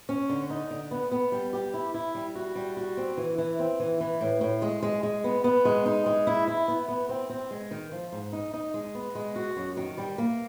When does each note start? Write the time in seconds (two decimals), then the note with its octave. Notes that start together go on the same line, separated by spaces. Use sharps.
0.09 C#4
0.29 D3
0.50 D#4
0.70 D3
0.91 B3
1.12 B3
1.32 G3
1.53 G4
1.74 E4
1.94 E4
2.15 G3
2.35 F#4
2.55 G3
2.77 F#4
2.97 C4
3.17 E3
3.38 E3
3.59 C4
3.80 E3
4.01 E3
4.21 A2
4.41 A2
4.62 G#3
4.83 G#3
5.03 G#3
5.24 B3
5.44 B3
5.65 G#3
5.86 D#4
6.06 G#3
6.27 E4
6.48 E4
6.68 B3
6.88 B3
7.09 C4
7.30 C4
7.51 G#3
7.71 D#3
7.92 F3
8.12 G#2
8.33 D#4
8.54 D#4
8.74 G#3
8.95 B3
9.15 G#3
9.36 F#4
9.56 F#2
9.77 D#3
9.98 G3
10.18 A#3